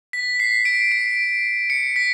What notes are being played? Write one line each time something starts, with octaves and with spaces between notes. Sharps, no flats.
B6
C7
D7
D7
C#7
B6